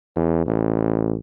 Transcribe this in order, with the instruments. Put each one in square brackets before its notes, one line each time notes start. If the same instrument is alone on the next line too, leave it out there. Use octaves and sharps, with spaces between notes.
[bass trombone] E2
A1